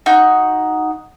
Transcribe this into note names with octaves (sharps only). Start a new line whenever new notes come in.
D#4 F#4